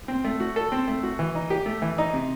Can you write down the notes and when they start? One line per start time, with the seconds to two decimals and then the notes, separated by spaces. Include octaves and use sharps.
0.08 C4
0.24 A3
0.40 F#4
0.56 A4
0.72 C4
0.88 A3
1.03 F#4
1.19 E3
1.35 D#4
1.50 G4
1.66 A3
1.82 E3
1.98 D#4
2.13 C3